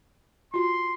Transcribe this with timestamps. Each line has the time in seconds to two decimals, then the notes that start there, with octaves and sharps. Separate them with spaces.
0.54 F4 F#4 C6